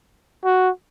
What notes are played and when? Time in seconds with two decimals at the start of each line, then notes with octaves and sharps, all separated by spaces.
0.45 F#4